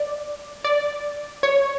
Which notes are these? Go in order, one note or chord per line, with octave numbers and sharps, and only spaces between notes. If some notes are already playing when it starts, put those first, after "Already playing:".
Already playing: D5
D5
C#5